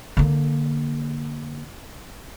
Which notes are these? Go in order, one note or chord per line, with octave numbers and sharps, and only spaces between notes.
D3 A#3